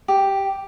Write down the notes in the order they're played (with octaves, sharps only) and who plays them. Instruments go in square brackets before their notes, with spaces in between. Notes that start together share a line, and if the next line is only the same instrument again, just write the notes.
[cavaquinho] G4